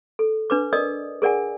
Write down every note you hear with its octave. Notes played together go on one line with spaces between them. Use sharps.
A4
D4 B4 D6
A#4 D5 D#5 D#6
G#4 A#4 D5 F#5 G#5